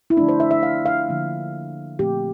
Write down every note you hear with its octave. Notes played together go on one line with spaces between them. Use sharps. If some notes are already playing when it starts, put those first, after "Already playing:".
E4
D3 F3 A3 D4
C5
E5
E5
F5
F5
D3 F3 A#3
A#2 F3 A3 C4 G4